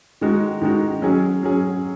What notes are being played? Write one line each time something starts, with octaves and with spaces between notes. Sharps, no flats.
D#3 G#3 D#4 F#4
D#3 G#3 D#4 F#4
F#3 C#4 G#4
F#3 C#4 G#4